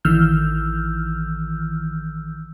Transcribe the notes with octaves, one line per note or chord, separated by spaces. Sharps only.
A1 D#3 E3 E6 F6 G6